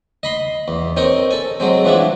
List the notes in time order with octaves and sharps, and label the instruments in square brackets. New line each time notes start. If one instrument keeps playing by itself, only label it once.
[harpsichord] D#5 B5 C6
E2
C4 D#4 A#4 C#5
A4 G#5
F#3 G#3 C4
E3 F3 B3 D4 E4